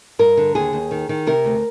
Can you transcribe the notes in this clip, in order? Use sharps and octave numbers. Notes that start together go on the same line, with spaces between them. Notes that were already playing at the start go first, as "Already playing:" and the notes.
G2 A#4
D3
D#2 G#4
D#2
D#3
D#3
C3 A#4
D2